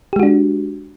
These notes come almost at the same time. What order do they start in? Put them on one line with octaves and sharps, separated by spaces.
G4 G#3 F#4 D4